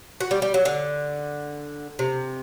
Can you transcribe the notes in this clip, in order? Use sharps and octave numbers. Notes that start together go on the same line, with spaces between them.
F#4
G3
G3
F#3
D3
C3